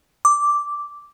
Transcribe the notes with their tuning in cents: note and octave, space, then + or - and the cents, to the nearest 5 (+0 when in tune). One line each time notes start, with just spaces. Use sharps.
D6 -5